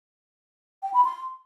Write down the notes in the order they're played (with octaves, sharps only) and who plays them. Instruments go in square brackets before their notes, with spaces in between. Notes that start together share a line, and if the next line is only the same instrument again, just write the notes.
[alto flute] G5
B5
C6